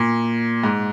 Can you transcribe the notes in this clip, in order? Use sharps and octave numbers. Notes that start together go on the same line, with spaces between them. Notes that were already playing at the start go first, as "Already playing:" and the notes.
Already playing: A#2
G#2